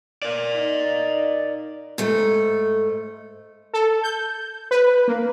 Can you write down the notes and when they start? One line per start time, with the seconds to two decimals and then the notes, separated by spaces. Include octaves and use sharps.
0.22 A#4 D5
0.57 D#4
1.98 G#2 A3
3.73 A4
4.03 G6
4.71 B4
5.08 A#3